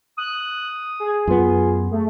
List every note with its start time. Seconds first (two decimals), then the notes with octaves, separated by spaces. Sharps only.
0.18 D#6 F#6
1.00 G#4
1.28 F#2 B3 F4
1.91 A3 G#4